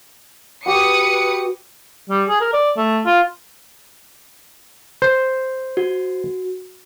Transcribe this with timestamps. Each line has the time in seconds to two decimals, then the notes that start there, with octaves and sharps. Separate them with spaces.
0.66 F#4 G4 B4 D#6 C#7
2.09 G3
2.29 G#4
2.41 A#4
2.53 D5
2.77 A3
3.06 F4
5.02 C5
5.77 F#4